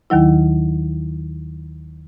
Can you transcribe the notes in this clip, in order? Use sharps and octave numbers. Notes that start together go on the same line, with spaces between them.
D#2 D#3 F#3 E4